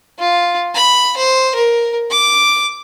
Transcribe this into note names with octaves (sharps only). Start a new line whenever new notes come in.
F4
B5
C5
A#4
D6